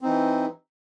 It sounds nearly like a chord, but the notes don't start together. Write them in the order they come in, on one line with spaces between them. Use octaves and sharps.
C4 D#4 E3